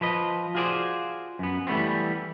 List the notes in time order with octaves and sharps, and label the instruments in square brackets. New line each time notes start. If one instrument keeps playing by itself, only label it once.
[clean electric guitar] F3 B4 D#5
F4 F#4 G#4 C5 D5
F#2 B3
E3 G3 A3 B3 C4